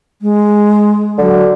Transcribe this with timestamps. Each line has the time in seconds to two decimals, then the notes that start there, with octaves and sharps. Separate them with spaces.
0.22 G#3
1.18 D3 F#3